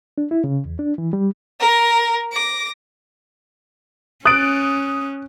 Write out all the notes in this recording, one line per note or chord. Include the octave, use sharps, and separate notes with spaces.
D4
E4
C#3
E2
D4
E3
G3
A#4
D6 A#6
C#4 D#6 F#6 A6 D7